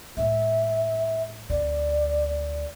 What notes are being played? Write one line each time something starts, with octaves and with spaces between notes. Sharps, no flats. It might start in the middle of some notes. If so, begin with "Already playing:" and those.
A2 G#3 E5
D2 C4 D5